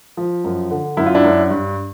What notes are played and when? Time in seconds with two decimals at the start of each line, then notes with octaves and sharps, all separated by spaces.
0.17 F3
0.44 F#2
0.71 D3
0.97 F#2 E4
1.06 F4
1.15 D4 E4
1.24 F#2
1.51 G2